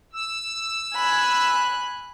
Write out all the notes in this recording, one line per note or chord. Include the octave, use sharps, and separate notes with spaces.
E6
G#5 B5 F#6